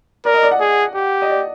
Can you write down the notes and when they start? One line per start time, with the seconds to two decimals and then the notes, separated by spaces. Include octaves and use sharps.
0.25 A#4 D5
0.34 D#5
0.43 D5
0.51 F#5
0.60 G#4
0.95 G4
1.22 D#5
1.30 D5